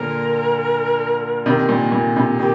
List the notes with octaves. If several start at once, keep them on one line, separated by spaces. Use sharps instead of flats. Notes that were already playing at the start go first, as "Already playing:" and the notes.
Already playing: A#2 D3 A#4
C3 D#3
A#2
A#2
C3
D#3 G4